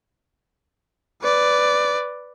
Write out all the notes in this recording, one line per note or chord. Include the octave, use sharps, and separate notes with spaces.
B4 D5